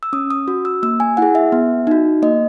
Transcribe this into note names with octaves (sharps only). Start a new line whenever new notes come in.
E6
C#4 D#6
D#6
F#4
E6
A#3 E6
G#5
E4 G#4 F#5
E5
B3
D#4 F#4
A#3 D#5